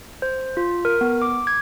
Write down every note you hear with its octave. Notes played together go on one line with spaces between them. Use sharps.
C5
F4
A#4
B3
D6
G#6